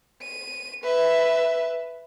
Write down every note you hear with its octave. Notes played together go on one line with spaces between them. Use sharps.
D#7
B4 E5